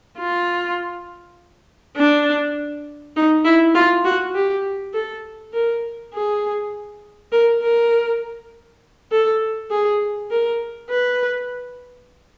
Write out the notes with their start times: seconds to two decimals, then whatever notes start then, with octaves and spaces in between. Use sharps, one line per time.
0.18 F4
1.97 D4
3.16 D#4
3.45 E4
3.75 F4
4.05 F#4
4.35 G4
4.94 A4
5.53 A#4
6.14 G#4
7.32 A#4
7.62 A#4
9.12 A4
9.70 G#4
10.31 A#4
10.90 B4